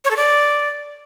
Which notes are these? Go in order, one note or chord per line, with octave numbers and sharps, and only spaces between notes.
C#5
A4
D5